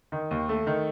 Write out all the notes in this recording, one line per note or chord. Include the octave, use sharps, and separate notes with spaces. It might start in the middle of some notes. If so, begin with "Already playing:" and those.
D#3
D#2
A3
D#3